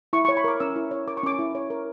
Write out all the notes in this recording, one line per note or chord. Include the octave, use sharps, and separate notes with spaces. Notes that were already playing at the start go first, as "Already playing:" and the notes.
E4 C#6
C#6
C#5
B5
A#4 D6
C#4 E6
E4
C#5
A#4 D6
C#6
C#4 D6
E4
C#5
A#4